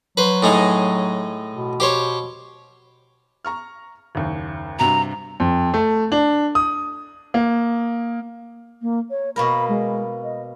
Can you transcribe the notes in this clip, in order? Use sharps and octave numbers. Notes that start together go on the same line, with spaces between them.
F#3 B4 C5
A2 G#3 D#4
B2
G4 C5 C#5
A#5 C#6 F6
F#1 D#2
G2 C3 F#4 A#5
F2
A3
D4
D#6
A#3
A#3
C#5
B2 A#3 A#4 B5
G#3
D#5